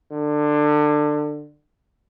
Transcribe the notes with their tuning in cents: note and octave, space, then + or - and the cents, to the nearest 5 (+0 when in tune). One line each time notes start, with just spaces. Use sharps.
D3 +20